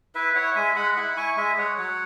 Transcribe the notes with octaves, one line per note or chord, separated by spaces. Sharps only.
E4 B4 E5
E4 C#5 F#5
G#3 E5 G#5
G#3 F#5 B5
E4 F#5 B5
B5
E4 G#5 C#6
G#3 E5 G#5
G#3 C#5 F#5
F#3 C#5 F#5